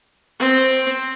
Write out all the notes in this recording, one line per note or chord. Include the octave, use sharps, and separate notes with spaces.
C4